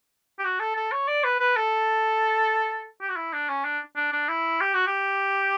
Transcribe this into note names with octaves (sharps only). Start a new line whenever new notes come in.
G4
F#4
A4
A4
C#5
D5
B4
B4
A4
G4
F#4
E4
D4
C#4
D4
D4
D4
E4
G4
F#4
G4